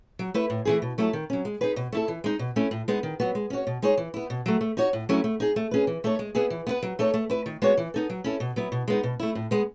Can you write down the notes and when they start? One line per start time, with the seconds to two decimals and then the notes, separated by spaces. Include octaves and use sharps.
0.19 F#3
0.34 A3 E4 B4
0.50 A2
0.65 E3 A3 E4 G#4
0.82 B2
0.98 F#3 A3 E4 A4
1.13 D#3
1.30 F#3 C#4
1.45 G#3
1.61 D#4 G#4 B4
1.76 B2
1.92 A3 E4 A4
2.08 E3
2.24 G#3 D#4
2.39 B2
2.56 A3 C#4 E4
2.71 A2
2.88 G#3 B3 D#4
3.03 D#3
3.20 F#3 B3 F#4
3.35 G#3
3.50 C#4 F#4 C#5
3.67 B2
3.82 G#3 D#4 G#4 C#5
3.98 E3
4.14 B3 E4
4.30 B2
4.46 F#3 A3
4.61 A3
4.77 D#4 F#4 C#5
4.93 A2
5.09 F#3 A3 C#4 E4
5.24 A3
5.40 D#4 G#4
5.56 A3
5.71 C#4 G#4 B4
5.87 E3
6.04 A3 D#4 A4 C#5
6.19 G#3
6.35 B3 E4 G#4
6.50 E3
6.67 B3 E4 B4
6.83 F#3
6.99 A3 D#4 A4 C#5
7.14 A3
7.30 E4 B4
7.46 D#3
7.62 G#3 B3 F#4 C#5
7.78 E3
7.94 B3 D#4 A4
8.10 F#3
8.24 C#4 E4 A4
8.40 B2
8.56 F#3 B3 E4
8.72 B2
8.88 G#3 B3 D#4
9.03 B2
9.20 A3 E4
9.35 A2
9.51 G#3 B3